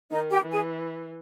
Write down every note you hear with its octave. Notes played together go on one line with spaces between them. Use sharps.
D#3 D#4 D#5
G4 G5
E3
G#4 G#5